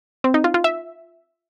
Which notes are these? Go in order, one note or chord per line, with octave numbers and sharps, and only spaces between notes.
C4
D#4
F4
F4
E5